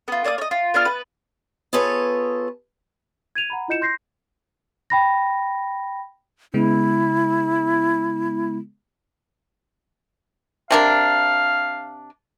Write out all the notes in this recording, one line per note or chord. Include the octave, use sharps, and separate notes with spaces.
B3 F4
A#3 D5 A5 D#6
C#5 D#5
F4
B3 D4 F4 F6
B3 B4
B3 F4 G#4 A4 B4 C#5
G#6 D#7 F7
F#5 A#5 B5
E4 F4 D#5 G6 C#7 E7
C6 G6 A#6 C7
G5 B5 A#6
C#3 G#3 B3 E4
C3 D4 A#4 F5